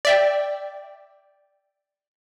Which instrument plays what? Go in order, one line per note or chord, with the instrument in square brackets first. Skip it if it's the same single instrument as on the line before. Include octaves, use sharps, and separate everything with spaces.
[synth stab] D5 E5 G5